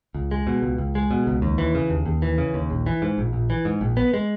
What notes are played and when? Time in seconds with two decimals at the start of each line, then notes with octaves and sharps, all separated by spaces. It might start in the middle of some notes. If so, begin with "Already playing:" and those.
0.14 C#2
0.31 G#3
0.47 B2
0.63 C#2
0.78 C#2
0.95 G#3
1.11 B2
1.27 C#2
1.42 D#2
1.58 E3
1.75 C#3
1.90 D#2
2.06 D#2
2.22 E3
2.38 C#3
2.54 D#2
2.70 A#1
2.86 E3
3.02 G#2
3.18 A#1
3.33 A#1
3.50 E3
3.65 G#2
3.81 A#1
3.97 B3
4.14 G#3